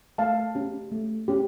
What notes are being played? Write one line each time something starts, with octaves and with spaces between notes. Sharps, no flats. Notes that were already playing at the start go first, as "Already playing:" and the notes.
A3 F5 A5
C#4 G4
A3
C#4 G4